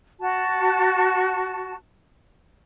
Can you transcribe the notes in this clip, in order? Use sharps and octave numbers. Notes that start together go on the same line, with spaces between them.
F#4 A5